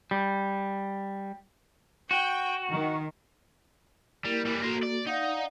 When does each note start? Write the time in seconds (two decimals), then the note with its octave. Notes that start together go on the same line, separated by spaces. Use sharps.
0.11 G3
2.11 F#4 G5
2.70 D#3
4.25 G3 A#3 E4 A#4
4.46 E3 G3
4.63 A#3 F#4 A4 A#4 C5
4.83 D5
5.07 D#4 D5 F5 F#5